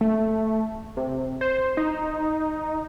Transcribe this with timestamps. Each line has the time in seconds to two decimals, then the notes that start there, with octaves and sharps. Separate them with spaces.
0.01 A3
0.97 C3
1.41 C5
1.77 D#4